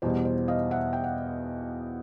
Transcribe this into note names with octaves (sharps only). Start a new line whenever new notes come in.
E2 B2 G3 C5
C5
D#5 F5
E5 F#5
G5
F#5